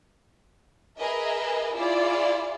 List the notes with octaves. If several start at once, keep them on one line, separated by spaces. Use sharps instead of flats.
G#4 A#4 B4 D#5 E5
E4 F4 G#4 D5